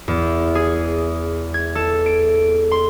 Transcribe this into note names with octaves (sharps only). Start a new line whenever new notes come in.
E2
G#4
G#6
A4
D7
C6